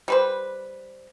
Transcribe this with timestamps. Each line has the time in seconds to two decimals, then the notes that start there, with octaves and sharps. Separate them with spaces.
0.08 G3 B4 C5